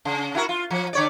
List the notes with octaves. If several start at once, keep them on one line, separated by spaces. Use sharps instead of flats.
C#3
E4 F#4 A#4
F4
F3
D3 C#5 D5